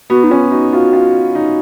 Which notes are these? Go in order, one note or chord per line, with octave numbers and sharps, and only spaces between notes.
B3 F#4
D#4
C#4 F4
D#4 F#4
F4 F#4
F4
D#4